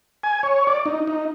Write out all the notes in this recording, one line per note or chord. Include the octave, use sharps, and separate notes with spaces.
G#5
C#5
D5
D#4
D#4